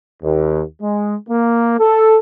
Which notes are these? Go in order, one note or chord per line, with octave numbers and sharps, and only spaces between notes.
D#2
G#3
A#3
A4